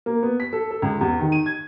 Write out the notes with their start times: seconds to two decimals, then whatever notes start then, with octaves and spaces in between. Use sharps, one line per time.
0.06 A#3
0.23 B3
0.40 B6
0.53 A4
0.71 A4
0.82 C#2
1.01 E2
1.19 D#3
1.32 D#7
1.46 G#6